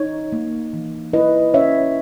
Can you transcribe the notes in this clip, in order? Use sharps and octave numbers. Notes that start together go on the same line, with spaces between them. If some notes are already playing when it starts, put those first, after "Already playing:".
Already playing: D#4 C#5
A#3
E3
E4 B4 D#5
C#4 C#5 E5